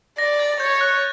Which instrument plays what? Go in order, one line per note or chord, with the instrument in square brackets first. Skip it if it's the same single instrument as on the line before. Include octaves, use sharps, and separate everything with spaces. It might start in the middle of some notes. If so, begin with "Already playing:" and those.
[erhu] D5 [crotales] A#6
[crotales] A6
[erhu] C#5 [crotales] G6
[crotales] F#6